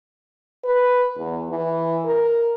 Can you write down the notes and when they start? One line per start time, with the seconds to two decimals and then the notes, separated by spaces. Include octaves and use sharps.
0.65 B4
1.18 E2
1.50 E3
2.05 A#4